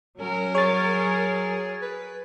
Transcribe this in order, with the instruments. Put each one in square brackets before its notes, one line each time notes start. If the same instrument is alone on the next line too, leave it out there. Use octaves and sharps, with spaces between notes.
[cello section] F#3 A#4 [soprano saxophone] C#4
[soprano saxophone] G#4 [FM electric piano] C#5 A6
[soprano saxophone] B4